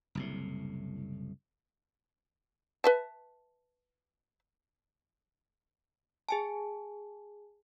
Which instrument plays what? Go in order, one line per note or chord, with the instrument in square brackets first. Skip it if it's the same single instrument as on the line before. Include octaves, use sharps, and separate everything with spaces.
[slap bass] F#1 C2 A2
[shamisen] B4 E5 A5
[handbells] G#4 G#5 A5